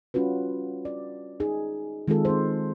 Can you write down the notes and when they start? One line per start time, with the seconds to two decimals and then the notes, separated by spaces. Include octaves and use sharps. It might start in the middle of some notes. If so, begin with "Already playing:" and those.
0.14 G3 C#4 F4 F#4 B4
0.85 D5
1.40 D#4 G#4
2.08 D#3 G#3 C4 F4 G#4 A4
2.25 C4 C5